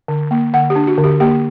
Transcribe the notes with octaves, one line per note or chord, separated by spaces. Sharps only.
D3
A#3
D3 F#5
G4
D4
F#4
D3
G4
A#3 G4